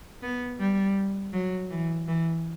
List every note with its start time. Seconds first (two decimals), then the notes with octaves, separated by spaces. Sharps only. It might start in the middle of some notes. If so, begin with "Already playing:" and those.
0.23 B3
0.60 G3
1.33 F#3
1.70 E3
2.08 E3